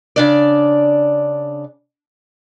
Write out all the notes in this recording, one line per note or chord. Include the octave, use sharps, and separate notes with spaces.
C#3 D4 D5